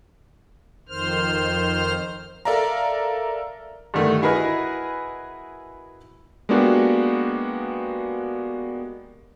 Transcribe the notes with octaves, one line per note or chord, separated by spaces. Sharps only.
F2 D#3 C5 F6
A4 A#4 D5 E5 F5 A#5
G2 D3 D#3 A3
E4 F#4 G#4 A#4 B4 D#5
G#3 A#3 B3 D4 F#4 G4